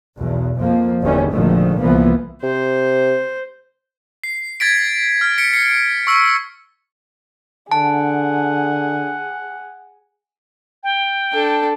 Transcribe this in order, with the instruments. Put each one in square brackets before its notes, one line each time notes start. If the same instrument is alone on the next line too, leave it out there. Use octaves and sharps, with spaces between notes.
[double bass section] B1 E2 B2
F2 F3 A#3
F#1 E2 D3 D#3 G3 C#4
G#1 A#2 D3 D#3 F3 A3
C2 E3 F3 A#3 B3
[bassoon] C3 [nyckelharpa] C5
[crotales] C7
G#6 A6 B6 D7
F6
B6 C#7 D7
C7 C#7
C#6 E6 B6
[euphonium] D3 [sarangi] G#4 [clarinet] F#5 [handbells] A5
[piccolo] G5
[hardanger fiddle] D4 A4